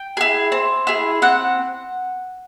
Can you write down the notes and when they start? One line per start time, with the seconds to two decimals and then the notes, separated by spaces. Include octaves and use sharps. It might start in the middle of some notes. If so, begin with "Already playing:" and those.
Already playing: G5
0.17 E4 G#4
0.52 C4
0.87 E4 G#4
1.22 C4 F#5